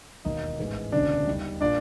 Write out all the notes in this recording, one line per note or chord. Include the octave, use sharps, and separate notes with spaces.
E1 D#2 D#3 D#4 D#5
A1 G#2 E3 G#3
E1 D2 C#3 D4 D5
D#2 D#3 G3
A#2 D4 D5